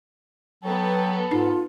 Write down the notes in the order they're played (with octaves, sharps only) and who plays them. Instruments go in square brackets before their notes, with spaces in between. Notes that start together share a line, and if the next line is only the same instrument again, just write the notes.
[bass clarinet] F#3 [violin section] B3 A4 [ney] G5
[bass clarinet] G#2 [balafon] D#4 [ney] F4